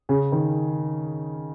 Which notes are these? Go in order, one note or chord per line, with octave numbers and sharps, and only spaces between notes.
C#3
D#3